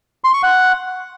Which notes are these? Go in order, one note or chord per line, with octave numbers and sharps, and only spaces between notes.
C6
C#6
F#5